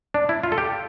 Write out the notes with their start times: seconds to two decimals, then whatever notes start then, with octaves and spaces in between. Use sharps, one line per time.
0.14 D4
0.29 E4
0.43 F4
0.52 A4
0.58 G4